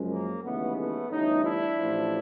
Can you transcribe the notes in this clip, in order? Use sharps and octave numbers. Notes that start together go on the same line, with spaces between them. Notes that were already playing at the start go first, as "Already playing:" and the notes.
Already playing: F#2 C#3 F3 G#3
A#3
D#2 C#3 E3 G#3 A3 B3
A3 B3
G1 G2 E3 A3 C#4 D#4
D4 E4
A1 A2 F3 A3